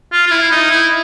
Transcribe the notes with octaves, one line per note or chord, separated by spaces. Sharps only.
F4
F4
E4
D#4
E4